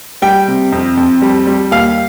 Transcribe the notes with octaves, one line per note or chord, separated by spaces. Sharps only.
G3 G5
C3
F2
F2
G3
G3
D#2 F5